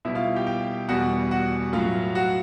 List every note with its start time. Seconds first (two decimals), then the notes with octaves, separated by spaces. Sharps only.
0.05 B2 G3 E4 E5
0.15 F4 F5
0.36 G4 G5
0.47 G4 G5
0.89 E2 B2 G3 F#4 F#5
1.31 F#4 F#5
1.73 A2 F#3 F4 F5
2.15 F#4 F#5